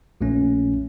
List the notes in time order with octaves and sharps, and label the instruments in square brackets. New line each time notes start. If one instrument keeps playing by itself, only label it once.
[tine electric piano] A#1 A#2 A3 C#4